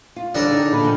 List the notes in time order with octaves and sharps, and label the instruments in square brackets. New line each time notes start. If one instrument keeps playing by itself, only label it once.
[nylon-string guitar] F4
[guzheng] D3 [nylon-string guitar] G3 [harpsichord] D4 A#4 D5 [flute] C#5
[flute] D#4 [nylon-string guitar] G#4 [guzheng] A#5
[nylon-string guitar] A#2 D3 A5 [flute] B5
[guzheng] D#3 F3 B3